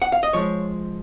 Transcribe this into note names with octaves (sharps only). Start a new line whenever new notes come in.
F#5
F5
D#5
F3 G#3 C#5